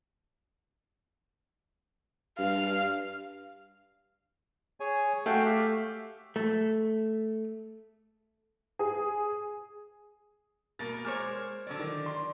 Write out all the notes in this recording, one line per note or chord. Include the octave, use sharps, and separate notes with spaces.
G2 F5
G#4 C#5 G#5
A3 F#4 F5 G5
G4 E5 F5
A3
G#4
B2 A#3 A#4 A6
G#3 A#4 C5 C#5 D6 F6
D3 F#3 D5
D#3
D5 C6